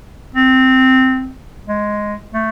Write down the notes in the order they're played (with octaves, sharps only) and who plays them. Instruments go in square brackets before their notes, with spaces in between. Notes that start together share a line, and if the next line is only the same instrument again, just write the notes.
[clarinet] C4
G#3
A3